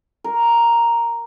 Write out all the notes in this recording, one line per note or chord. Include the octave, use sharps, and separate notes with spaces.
A#4